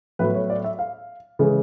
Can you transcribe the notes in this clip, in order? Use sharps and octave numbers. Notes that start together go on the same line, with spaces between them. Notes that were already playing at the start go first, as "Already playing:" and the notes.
A2 F#3 B3 B4
C#5
D5
E5
F5
C#3 E3 G#3